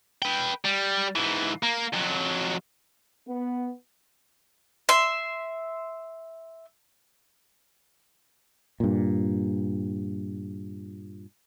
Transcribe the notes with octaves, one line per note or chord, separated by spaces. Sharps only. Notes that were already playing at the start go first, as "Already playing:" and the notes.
B4 G5
G3
G#2 E3
A#3
F2 F#3
B3
E5 C6
G2 A#2